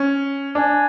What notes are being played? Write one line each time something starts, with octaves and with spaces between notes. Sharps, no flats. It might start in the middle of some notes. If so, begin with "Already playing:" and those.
Already playing: C#4
D4 G#5